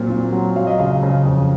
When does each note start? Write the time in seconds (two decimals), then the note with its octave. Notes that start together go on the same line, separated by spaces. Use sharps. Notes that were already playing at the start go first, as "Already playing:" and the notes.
Already playing: A#2 F#3 C4
0.10 A#2
0.32 F#3
0.56 F#3 F5
0.67 D#5
0.79 C#3 F5
1.03 C#3
1.25 F2